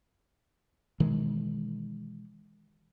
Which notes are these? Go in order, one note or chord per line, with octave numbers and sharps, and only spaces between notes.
B2 D#3 E3 G#3